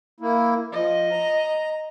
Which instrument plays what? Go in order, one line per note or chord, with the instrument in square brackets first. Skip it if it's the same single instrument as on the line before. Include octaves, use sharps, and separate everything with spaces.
[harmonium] A#3 E4
[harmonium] F3 [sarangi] D#5
[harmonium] A#5